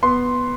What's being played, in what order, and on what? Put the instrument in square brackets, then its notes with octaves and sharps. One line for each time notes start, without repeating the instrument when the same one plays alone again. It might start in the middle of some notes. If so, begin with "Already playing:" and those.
[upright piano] B3 C6